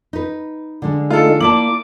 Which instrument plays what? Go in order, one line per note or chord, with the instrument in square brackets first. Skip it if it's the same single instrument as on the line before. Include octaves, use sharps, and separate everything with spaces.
[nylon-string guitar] D#4 B4
D3 G#3 D4
[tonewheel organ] A3 D#4 [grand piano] F4 A4
[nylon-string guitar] A#3 E4 D5 [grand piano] A5 F#7 [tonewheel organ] D6